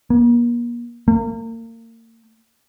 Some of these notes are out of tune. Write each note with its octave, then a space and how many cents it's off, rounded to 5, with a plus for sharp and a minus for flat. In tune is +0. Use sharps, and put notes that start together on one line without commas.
A#3 +40
A#3 -35